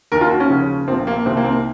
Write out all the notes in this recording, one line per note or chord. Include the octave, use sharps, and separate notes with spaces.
D#2 D#3 A#4
F4
F#4
C#4
D#2 C#3 F3
A#1 A#2 F3 C4
A#3
C2 C3 D#3 C4
A#3
C4